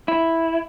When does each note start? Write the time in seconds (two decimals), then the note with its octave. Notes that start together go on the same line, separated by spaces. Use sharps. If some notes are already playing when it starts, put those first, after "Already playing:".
0.08 E4